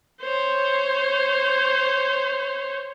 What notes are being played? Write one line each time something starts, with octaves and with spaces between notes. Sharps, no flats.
C5 C#5